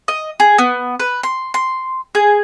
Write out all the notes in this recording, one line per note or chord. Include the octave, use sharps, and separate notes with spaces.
D#5
G#4
B3
B4
C6
C6
G#4